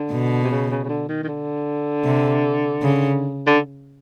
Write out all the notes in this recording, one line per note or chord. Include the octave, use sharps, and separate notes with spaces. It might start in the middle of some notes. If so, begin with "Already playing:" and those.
Already playing: D3
B2
C3
C#3
C#3
C#3
D3
D#3
D#3
D3
C3
C#3
D3